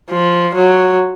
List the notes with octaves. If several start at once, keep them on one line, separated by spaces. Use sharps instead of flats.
F3
F#3